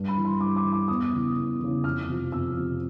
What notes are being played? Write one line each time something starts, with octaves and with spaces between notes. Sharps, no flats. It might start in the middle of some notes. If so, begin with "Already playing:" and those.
Already playing: G2
B5
E3
C6
G2 D6
D6
E3
D6
E2 D#6
C#3 E3
E2
C#3 E3
F2 F6
C3 F3
F2 E6
C3 F3